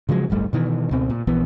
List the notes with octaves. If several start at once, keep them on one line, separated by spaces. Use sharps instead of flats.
C#3 F3 F#3 G#3
D1 G1 G3 A3
B2 D#3 E3
C#2 B2 C4
A#2
A#1 E3 B3